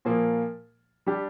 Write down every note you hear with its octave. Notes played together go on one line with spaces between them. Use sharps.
A#2 F3 A#3
G3 D4 G4